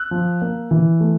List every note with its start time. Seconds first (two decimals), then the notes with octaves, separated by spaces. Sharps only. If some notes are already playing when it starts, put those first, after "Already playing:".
Already playing: E6 F#6
0.11 F3
0.42 A#3
0.71 E3
1.00 A3